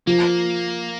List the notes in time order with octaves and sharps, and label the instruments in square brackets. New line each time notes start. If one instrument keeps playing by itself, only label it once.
[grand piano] F3 [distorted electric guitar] A#3